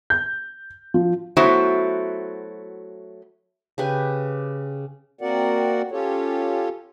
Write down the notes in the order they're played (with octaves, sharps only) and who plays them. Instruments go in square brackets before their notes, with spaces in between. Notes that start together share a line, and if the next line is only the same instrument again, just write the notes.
[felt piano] G6
F3
[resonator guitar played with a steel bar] F#3 A3 B3 E4 F#4 C5
[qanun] C#3 G4 B4 G#5
[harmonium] A#3 C4 F#4 A#4 D5 F#5
C#4 F4 G4 A4 C#5